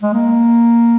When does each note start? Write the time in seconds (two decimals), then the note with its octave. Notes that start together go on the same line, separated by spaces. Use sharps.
0.03 G#3
0.14 A#3